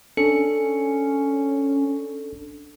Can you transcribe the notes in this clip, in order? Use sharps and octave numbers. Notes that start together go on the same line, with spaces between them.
C#4 D4 A4 C#7